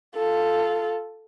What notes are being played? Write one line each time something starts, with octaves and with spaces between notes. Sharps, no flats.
F4 A4